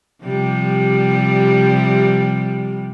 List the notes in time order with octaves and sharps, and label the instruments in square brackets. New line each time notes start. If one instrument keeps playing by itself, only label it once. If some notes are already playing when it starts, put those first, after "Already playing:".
[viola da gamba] C3 F3 G3